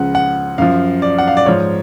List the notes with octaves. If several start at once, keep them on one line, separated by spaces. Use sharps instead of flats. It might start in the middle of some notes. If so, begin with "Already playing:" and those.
Already playing: C#2 C#3 F3 F#5
F#5
F#2 F3 F5
D5
F#5
F5
D5
G#2 F3 C#5